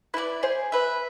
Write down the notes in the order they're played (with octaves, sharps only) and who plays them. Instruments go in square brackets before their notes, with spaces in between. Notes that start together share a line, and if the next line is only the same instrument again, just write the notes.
[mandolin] E4 A4 D5 [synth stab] B4
[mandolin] G#4 [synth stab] C5
[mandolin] B4 E5